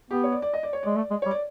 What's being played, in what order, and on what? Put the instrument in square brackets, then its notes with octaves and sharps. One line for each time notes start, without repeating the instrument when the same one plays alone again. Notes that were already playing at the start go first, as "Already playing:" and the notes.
[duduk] B3 [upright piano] G4
[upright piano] C#5
D5
D5
D#5
D5
C#5
[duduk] G#3 [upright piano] D5
[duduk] A3
G#3
[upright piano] C#5
[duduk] G3
[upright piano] D5